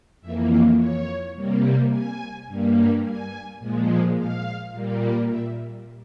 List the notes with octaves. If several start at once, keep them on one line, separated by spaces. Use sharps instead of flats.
F2 E3 A#3 E5
C#5
C#5
C3 G3 A#3
G#5
G2 G3 A#3
G#5
A#2 F3 G#3
F5
A#2 G3 A#3
E5